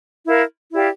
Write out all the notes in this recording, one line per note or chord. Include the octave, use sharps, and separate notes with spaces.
E4 A#4 F5
E4 G4 D5 F5